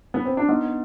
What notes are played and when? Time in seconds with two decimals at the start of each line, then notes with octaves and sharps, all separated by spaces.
0.14 B3
0.25 C4
0.37 D4
0.48 B3 D#4